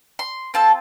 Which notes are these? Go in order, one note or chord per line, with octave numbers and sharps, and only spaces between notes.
C6
C4 F4 A4 A5